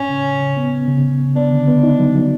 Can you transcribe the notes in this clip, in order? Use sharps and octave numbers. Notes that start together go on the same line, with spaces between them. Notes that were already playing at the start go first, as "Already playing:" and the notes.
Already playing: A2 C#4
C#3
C#3
C#3
B3
B3
C#3
C#3
C#3
B3 D4
D3
B3
D#4
F#3
F#3